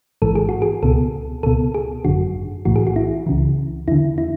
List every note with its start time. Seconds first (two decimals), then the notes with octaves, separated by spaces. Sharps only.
0.22 A1 G#2 E3 A4
0.35 G#4
0.49 F#4
0.62 G#4
0.83 C#2 B2 A4
1.43 C#2 B2 A4
1.74 G#4
2.05 G#1 F#2 D3 F#4
2.65 B1 A2 E3 F#4
2.76 G#4
2.87 F#4
2.96 E4
3.26 C#2 C#3 E3
3.88 E2 D3 E4
4.18 E4